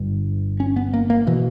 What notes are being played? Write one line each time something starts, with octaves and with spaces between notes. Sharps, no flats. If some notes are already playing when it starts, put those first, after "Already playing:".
Already playing: G1 G2
C#4
B3
A#3
A#3
B2 E3